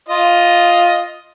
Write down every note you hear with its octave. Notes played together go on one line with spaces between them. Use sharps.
F4 D#5